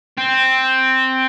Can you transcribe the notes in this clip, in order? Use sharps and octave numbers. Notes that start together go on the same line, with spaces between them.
C4